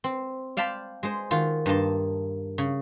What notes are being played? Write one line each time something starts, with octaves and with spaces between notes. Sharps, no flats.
C4
D5 F5 G5 A5 B5 C6
G#3 G#4 C5
D#3 F4 F#4
G2 A#3 D#5 A5 C6
C#3